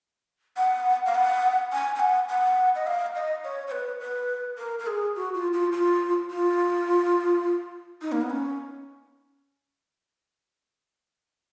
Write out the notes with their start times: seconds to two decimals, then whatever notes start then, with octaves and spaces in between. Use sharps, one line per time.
0.57 F#5
1.06 F5
1.15 F#5
1.72 G#5
1.96 G#5
2.00 F#5
2.29 F#5
2.75 D#5
2.87 F5
3.15 D#5
3.44 C#5
3.67 C#5
3.72 B4
4.00 B4
4.58 A#4
4.79 A#4
4.87 G#4
5.16 F#4
5.34 F4
5.53 F4
5.72 F4
6.30 F4
8.02 D#4
8.12 A#3
8.21 B3
8.30 C#4